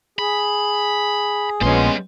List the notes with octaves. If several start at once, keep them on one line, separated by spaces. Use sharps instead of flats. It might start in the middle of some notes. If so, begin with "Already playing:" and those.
G#4 B5
A#1 A#2 G3 G#3 B3 C#4 C6